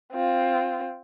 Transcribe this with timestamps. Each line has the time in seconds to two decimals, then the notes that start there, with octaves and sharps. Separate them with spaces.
0.13 C4 F4